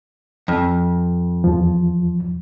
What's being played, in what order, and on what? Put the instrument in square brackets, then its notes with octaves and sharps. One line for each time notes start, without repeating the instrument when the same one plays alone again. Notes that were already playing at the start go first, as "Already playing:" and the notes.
[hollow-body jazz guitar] F2
[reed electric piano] E2 F3